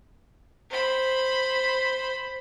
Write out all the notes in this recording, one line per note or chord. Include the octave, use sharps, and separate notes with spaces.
C5 B5